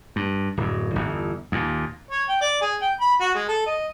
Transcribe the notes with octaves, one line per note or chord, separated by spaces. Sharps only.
G2
D1 F#2
G1 E2
D#2 A#2
C#5
G5
D5
G#4
G5
B5
F#4
G#3
A4
D#5